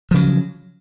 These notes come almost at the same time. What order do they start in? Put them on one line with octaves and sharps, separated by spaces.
F3 C#3 F#3